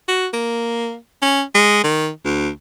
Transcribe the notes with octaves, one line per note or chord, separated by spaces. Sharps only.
F#4
A#3
C#4
G#3
D#3
D2